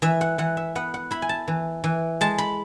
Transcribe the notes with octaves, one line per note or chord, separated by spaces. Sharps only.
E3 E5
F#5
E3 F#5
E5
B3 F#5
F#5
E4 B5
G#5
A5
E3
E3
G#3 A5
B5